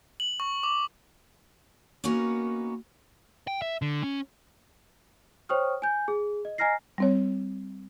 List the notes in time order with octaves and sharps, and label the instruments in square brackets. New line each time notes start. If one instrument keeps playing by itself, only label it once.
[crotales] F#7
C#6
D6
[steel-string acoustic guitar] A#3 B3 C#4 D#4 F#4 A#4
[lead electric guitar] G5
E5
D3
C#4
[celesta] C5 C#5 G5 C#6 D#6 F6
G#5 G6
G#4
D#5
D#5 G#5 A#5 F6 A#6 C7
[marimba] G3 C4 C#5